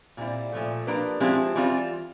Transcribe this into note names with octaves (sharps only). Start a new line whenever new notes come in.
A#2 G3 C4 E4
A#2 F3 A3
F3 A#3 D4 G4 B4
F3 G#3 C4 E4 G4
E3 G3 C4 F4